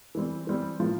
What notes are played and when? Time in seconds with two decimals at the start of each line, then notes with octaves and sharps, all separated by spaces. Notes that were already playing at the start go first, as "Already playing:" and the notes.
0.15 E3 G3 C4
0.47 E3 G3 C4
0.79 A2 F3 A#3